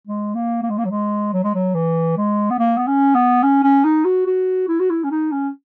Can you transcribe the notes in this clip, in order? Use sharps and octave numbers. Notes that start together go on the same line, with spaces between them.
G#3
A#3
A#3
G#3
A#3
F#3
G#3
F#3
G#3
F#3
E3
G#3
B3
A#3
B3
C#4
B3
C#4
C#4
D#4
F#4
F#4
E4
F#4
E4
C#4
D#4
C#4